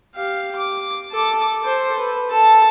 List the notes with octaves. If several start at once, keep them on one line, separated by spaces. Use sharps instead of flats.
G4 F5
D6
A4 D6
A4 C5
B4
A4 A5